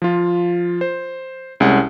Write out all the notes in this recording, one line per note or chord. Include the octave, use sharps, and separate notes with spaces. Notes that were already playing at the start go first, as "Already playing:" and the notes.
F3 F4
C5
C2 G#3 C#4 F#5